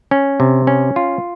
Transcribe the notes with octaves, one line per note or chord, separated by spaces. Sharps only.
C#4
C3
C#4
F4